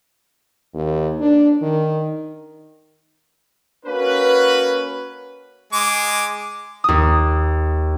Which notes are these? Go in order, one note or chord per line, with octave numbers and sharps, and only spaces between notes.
D#2
D4
D#3
A#3 C#4 F#4 B4
G#3 D6
D#2 D#6